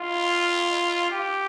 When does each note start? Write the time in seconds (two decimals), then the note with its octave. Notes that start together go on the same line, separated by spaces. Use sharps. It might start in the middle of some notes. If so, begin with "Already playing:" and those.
Already playing: F4
1.11 G4